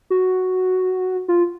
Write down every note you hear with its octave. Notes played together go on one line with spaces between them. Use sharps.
F#4
F4